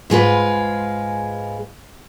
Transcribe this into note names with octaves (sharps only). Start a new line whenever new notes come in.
G#2 G#3 F4 B4